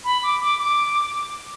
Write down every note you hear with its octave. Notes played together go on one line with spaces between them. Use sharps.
B5
D6
D6
D6